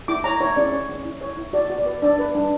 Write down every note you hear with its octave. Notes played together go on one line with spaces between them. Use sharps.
E4 D6
C#5 A#5
E4 C#5
C#4 D5
C#5
C#4
E4
C#5
E4
F#4 D5
F#4
D5
B4
D4 D5
B4
D4